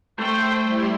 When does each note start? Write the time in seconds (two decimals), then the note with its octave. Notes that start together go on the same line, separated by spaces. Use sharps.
0.19 A3 C5 G5 A5
0.63 G3 E4 C6